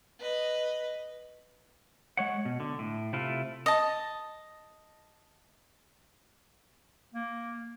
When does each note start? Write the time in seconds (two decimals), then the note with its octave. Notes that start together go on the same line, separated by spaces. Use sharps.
0.19 B4 D#5
2.17 G#3 C#5 F#5
2.45 B2
2.60 D3
2.79 A2
3.13 C3 A3 E4 F4
3.66 D#5 A5
7.14 A#3